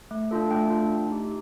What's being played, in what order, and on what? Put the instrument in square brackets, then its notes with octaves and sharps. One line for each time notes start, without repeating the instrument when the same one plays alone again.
[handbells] A3
D4 F4 A4
A3 G5
D4 F4 A4
A3
D#4 G4